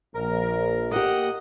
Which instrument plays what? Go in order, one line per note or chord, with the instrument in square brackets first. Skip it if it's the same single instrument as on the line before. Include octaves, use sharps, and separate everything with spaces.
[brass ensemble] A#1 [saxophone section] A#4
[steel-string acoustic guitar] A#3 G4 [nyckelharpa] D#5 F#5